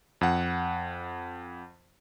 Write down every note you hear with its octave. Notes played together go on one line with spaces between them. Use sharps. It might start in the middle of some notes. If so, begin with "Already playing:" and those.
F2 F#5